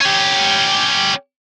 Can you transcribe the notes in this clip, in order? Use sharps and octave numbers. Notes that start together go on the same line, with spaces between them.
C#4 G4